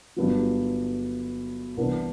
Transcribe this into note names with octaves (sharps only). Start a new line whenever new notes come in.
G1 G2 F#3
C2 C3 E3 B3 D4